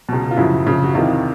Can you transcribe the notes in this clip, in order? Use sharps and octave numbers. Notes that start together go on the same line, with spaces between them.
C#2 B2
F4
F#2 C#3 F3 E4 F#4
F#2 C#3 F3
F#4
E2 C3 D#3 D#4 F4